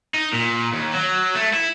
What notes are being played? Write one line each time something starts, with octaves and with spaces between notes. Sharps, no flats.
D#4
A#2
D#2
F#3
A3
E4